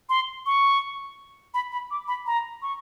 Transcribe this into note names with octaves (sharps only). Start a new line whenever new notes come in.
C6
C#6
B5
B5
D6
B5
A#5
C#6